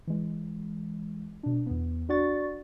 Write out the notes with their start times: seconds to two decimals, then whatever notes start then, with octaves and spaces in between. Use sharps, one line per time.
0.07 E3 G#3
1.43 B2 D4
1.66 E2 B3
2.09 D4 F#4 D5 F#5 C#6 A6